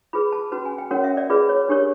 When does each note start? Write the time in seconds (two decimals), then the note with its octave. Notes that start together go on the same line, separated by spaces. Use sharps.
0.13 F4 G#4 B4 B5
0.32 A5
0.52 C#4 F#4 B4 A5
0.65 G#5
0.78 G5
0.91 C#4 F#4 A#4 C#5 F#5
1.04 E5
1.17 D5
1.30 F4 G#4 B4 D5
1.49 C#5
1.69 D4 G4 A#4 C#5